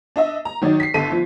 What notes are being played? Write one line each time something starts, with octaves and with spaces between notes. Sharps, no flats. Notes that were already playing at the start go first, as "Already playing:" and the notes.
D4 D#5 E5
A#5
D#3 F#3 D#4 D5
B6 C7
G1 D4 A4 B6 D#7
F3